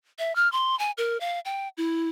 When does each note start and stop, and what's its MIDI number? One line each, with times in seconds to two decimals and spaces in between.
0.19 0.35 76
0.36 0.50 89
0.52 0.77 84
0.79 0.91 80
0.98 1.18 70
1.21 1.40 77
1.45 1.68 79
1.77 2.09 64